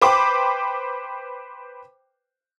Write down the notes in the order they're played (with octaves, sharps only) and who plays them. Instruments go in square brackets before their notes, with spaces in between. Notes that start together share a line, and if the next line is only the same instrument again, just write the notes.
[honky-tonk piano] B4 C5 G5 D6